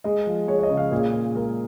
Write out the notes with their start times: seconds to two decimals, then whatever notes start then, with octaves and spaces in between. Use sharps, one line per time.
0.04 G#3 D#5
0.27 F3
0.48 G#3 C#5
0.59 C#5
0.63 D#5
0.70 C#3
0.77 F5
0.91 A#2 G#4
1.14 A#2
1.35 G#3 A#4